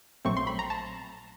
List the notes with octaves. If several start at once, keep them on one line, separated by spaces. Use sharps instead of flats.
A#1 A#2 F#3 A3 C4 C#6
C6
B5
A#5
A5